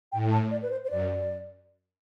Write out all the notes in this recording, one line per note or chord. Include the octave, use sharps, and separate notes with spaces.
A2 G5
A5
D5
B4
C5
C5
F#2 D5